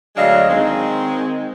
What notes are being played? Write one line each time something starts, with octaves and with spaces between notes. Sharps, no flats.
D2 F#3 G#3 D4 D#5 F5
D#3 G#3 C4